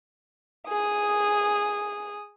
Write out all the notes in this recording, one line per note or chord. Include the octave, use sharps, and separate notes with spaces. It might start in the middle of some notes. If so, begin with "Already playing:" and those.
G#4 D#6